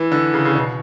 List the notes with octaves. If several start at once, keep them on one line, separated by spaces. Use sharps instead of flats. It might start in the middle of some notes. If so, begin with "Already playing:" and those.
Already playing: E3
D3
C#3
C#3
B2